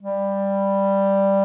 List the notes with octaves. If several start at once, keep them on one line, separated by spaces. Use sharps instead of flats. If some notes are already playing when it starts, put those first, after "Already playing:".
G3